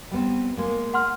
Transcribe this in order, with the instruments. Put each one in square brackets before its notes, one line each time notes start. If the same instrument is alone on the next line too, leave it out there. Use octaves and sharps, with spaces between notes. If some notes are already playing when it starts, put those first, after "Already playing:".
[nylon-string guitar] G3 B3 C4
G#3 A#3
[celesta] F#5 C6 F6